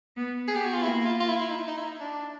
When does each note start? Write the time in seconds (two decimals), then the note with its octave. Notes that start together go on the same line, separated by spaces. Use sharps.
0.16 B3
0.48 B3 G#4
0.56 G4
0.65 F#4
0.74 F4
0.82 A#3 E4
1.01 E4
1.06 F4
1.21 F4
1.28 E4
1.42 E4
1.51 D#4
1.67 D#4
1.77 E4
1.84 D#4
2.00 D4